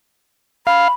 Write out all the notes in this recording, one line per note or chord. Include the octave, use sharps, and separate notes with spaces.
F5 B5